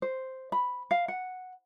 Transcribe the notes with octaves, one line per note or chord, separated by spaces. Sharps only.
C5
B5
F5
F#5